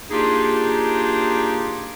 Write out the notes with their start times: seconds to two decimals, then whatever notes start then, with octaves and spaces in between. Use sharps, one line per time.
0.11 A#3 D4 D#4 F4 G4 G#4